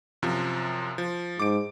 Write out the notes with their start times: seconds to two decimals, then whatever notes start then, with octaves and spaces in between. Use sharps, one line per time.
0.22 F#2 C3 F3
0.98 F3
1.40 G#2 D6 D7